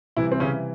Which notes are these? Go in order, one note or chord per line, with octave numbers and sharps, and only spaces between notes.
C3 E3 G3 E4
C4
C#3 C#4